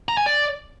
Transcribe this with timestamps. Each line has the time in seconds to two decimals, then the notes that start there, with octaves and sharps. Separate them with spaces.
0.09 A#5
0.17 G#5
0.26 D5